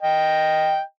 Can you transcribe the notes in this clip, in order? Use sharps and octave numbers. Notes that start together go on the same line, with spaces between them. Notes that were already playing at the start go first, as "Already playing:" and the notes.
D#5 G5